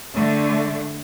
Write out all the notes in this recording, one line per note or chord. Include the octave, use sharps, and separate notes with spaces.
D3 A3